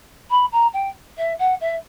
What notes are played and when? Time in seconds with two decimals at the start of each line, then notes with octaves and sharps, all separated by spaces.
0.30 B5
0.51 A#5
0.73 G5
1.17 E5
1.38 F#5
1.60 E5